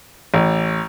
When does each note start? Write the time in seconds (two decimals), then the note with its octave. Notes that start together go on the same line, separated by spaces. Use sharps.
0.34 A1